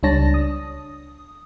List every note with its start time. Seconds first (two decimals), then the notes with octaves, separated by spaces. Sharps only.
0.03 C#2 G3 D4 C#5 A5 A#6
0.34 D#6